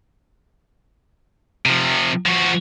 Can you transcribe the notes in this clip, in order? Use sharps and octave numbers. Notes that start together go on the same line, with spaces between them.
C3 F3
F3 F#4